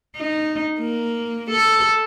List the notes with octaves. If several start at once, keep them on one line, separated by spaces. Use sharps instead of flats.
D#4
A#3
A4